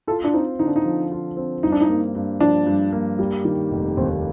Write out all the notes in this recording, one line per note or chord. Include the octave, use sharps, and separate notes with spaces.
F4 A4
D4
C4 D#4
D3 D#4
D4
D#4
F3
F4
C4
G2 D#4
D4
D#4
A#3
G2
F3 D4
G2
A#3
G3
D#3
F1
D#2 C4